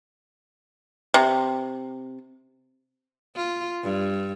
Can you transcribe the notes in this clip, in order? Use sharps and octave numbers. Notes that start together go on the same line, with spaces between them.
C3
F4
G2